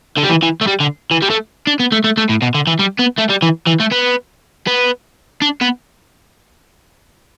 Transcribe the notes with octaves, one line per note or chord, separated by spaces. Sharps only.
D3
G3
E3
E3
A3
G3
D3
E3
G3
A3
D4
B3
A3
A3
A3
A2
B2
D3
E3
G3
B3
A3
G3
E3
E3
A3
B3
B3
D4
B3